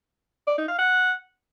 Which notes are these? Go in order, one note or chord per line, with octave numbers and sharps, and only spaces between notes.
D5
D#4
F5
F#5